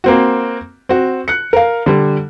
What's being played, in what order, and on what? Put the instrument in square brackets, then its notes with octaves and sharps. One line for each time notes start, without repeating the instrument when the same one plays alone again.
[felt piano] A#3 C4 F#4
C4 F#4
F#6 C#7
A#4 F5
D3 G3